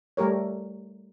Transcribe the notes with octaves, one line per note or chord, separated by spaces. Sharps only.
G3 A3 G4 A#4 C#5